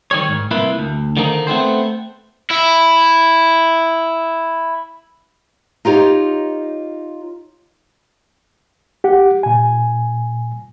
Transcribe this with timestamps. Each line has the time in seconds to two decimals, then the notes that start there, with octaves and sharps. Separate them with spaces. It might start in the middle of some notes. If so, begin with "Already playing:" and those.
0.11 D#3 G3 C#5
0.28 G#2
0.51 C2 A#3 E4 F4 B4
0.79 D2
1.17 D3 D#3 F3 A#3 C#4 D#4
1.47 A3 B3 C4 C5
2.50 E4 E5
5.85 D#4 F4 G4 C#5 D#5
9.04 G4 F#5
9.43 A#2 G#5